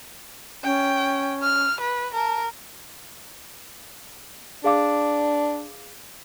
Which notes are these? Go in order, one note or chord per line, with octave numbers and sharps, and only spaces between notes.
C#4 G5
F6
B4
A#4 A5
D4 G#4 F5 D6